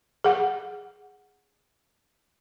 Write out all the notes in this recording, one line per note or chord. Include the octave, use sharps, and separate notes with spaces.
G#4 F#5